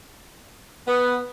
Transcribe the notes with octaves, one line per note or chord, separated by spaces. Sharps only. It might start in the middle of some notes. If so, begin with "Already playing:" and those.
B3